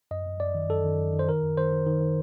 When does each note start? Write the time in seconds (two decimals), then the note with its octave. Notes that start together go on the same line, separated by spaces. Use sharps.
0.11 F#2 D#5
0.26 F#2
0.40 F#2 D5
0.55 D#3
0.69 F#2 A4
0.84 D#3
0.99 F#2
1.13 D#3
1.19 C5
1.28 D#3 A#4
1.42 F#2
1.57 D#3 C5
1.72 D#3
1.87 D#3
2.01 D#3